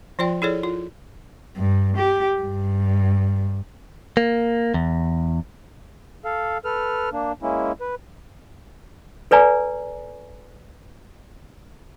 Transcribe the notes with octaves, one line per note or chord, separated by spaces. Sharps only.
F3 F4 D5 G5
E4 G#4 A4 C#5 D5
F4
G2
G4
G2
A#3
E2
A4 F5
A4 B4 F6
A#3 D4
G#3 A#3 C#4 E4
B4
A4 B4 D5 G#5 A#5